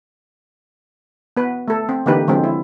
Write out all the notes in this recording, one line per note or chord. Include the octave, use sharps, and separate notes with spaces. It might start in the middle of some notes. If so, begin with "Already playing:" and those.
B3 B4
A3 A4
C4
D3 E3 A#3 D#4 G4 B4
D3 F3 F#3 G#3 C4
E4